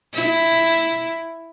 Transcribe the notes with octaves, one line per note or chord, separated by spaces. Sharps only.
E4